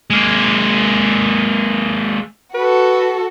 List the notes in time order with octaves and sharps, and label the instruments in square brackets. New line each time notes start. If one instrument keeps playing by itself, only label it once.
[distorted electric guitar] G#3 A#3
[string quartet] F#4 A4 [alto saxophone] B4